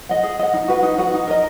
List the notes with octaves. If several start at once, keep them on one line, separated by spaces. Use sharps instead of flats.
D#5 F#5
G#4
D#5 F#5
D#4
F#4 B4 F#5
D#4
F#4 B4 F#5
D#4
A#4 D#5